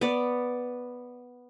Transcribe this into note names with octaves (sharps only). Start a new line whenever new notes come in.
B3 D5